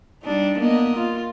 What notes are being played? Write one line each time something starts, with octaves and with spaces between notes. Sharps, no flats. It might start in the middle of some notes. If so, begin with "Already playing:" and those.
G3 D4 D#4
A#3 B3 D#5
F4